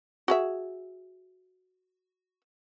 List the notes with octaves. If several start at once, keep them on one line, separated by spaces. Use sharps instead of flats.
F#4 G#4 E5